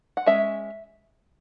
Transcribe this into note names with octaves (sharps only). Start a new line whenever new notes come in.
F#5
G#3 C#4 E5